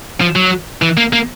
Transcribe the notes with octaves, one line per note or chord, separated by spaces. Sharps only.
F3
F#3
E3
A#3
A#3